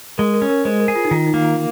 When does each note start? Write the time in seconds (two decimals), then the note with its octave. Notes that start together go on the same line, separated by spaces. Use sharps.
0.18 G#3 A#4
0.34 A#4
0.42 C#4
0.50 A#4
0.65 G#3 C5
0.80 A#4
0.88 G#4
0.95 F4
1.05 D#4
1.11 D#3 F4
1.26 D#4
1.34 A#3
1.42 F4